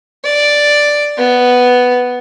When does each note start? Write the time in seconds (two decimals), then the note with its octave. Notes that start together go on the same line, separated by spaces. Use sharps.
0.25 D5
1.18 B3